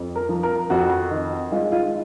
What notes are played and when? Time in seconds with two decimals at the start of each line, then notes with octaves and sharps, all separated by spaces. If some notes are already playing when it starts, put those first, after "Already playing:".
Already playing: F2
0.16 A#4
0.29 F3
0.43 A#4
0.70 F2 F#4
1.11 D#3
1.52 G#3 F4
1.72 F4